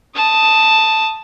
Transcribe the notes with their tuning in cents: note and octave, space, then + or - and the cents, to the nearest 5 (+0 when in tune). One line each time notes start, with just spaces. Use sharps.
A5 +0 D#6 +0